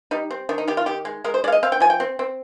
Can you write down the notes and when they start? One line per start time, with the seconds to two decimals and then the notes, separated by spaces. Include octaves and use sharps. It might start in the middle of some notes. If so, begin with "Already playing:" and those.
0.11 G3 D#4
0.30 C4
0.49 D#3 D4
0.58 D#4
0.68 D#3 G4
0.77 F4
0.86 D#3 G4
1.05 G#3
1.24 G#3 A#4
1.34 C5
1.44 G#3 D5
1.48 F5
1.52 D#5
1.63 C4 F5
1.72 G5
1.80 F3 G#5
1.90 G5
2.00 C4
2.19 C4